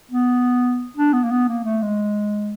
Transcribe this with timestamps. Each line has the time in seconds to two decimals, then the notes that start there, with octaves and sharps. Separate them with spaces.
0.11 B3
0.97 D4
1.13 B3
1.23 A#3
1.31 B3
1.48 A#3
1.64 A3
1.82 G#3